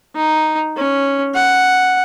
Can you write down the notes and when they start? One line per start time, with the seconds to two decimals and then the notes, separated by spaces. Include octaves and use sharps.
0.16 D#4
0.76 C#4
1.34 F#5